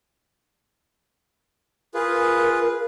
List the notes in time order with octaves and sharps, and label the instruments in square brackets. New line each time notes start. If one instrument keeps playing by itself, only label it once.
[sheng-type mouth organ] F4 G#4 B4 [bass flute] A#4